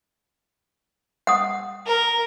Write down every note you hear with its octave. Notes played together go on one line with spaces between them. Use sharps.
F#5 D#6
A#4